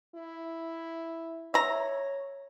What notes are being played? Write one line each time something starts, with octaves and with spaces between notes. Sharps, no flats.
E4
C#5 E5 A#5